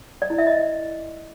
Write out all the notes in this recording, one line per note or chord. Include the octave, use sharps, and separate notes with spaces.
D5
E4
E5
D#5